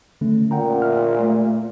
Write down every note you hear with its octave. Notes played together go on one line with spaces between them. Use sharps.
D3 A3 C#4
A#2 F#5 G5 A#5
E5 F6
A3